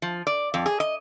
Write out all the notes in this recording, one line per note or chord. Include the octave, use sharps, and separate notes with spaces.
F3
D5
F2
G#4
D#5